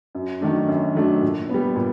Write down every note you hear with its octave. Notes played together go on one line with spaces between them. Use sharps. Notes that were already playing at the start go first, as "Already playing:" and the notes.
F#2
D#3 F#3 A3 D4
F#2
D#3 F#3 A3 D4
A#2
G3 B3
A#2